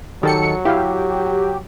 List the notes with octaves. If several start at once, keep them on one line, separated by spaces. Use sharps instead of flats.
D#3 F#3 G4 A4 C#7
E4 G4 F5